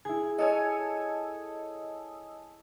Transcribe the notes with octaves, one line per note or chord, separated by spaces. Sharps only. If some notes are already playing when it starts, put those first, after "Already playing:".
E4 G#4 G#6
A4 C#5 D#5 G#5 D#6 E6